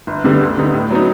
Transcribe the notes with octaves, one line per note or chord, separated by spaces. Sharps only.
G1
G2 D3 G3 B3
D2
D3 G3 B3 D#4
A2
F#3 B3 D#4